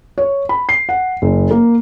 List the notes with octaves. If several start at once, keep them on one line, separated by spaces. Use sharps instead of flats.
C#5
B5
C7
F#5
F#1
A#3